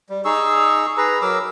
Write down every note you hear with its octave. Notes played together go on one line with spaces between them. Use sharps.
G3
D#4 G#4 C#6 E6
G#4 B4 A#5
F#3 A#4 D6 E6